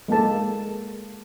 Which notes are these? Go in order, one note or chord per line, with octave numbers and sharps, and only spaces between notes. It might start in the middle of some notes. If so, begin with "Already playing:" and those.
G#3 A#3 A4 A5